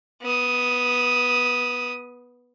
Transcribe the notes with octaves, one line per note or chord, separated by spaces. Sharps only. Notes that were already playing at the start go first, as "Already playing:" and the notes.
B3 D#6